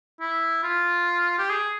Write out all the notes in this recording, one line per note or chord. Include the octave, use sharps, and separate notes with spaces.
E4
F4
G4
G#4